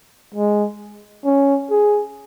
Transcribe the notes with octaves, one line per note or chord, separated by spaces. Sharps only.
G#3
C#4
G#4